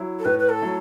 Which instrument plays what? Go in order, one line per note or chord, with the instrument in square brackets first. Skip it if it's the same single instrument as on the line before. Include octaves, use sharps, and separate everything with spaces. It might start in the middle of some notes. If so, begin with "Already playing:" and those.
Already playing: [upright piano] F#3 E4
[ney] A4
[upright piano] A2 [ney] B4
[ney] B4
A4
[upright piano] F#3 A3 E4